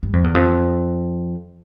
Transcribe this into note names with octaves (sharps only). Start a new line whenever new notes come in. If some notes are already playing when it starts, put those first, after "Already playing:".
G2
F2
E2
F2